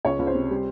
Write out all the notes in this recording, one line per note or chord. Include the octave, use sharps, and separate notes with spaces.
C#2 C#5
C#2
C5
C3
G3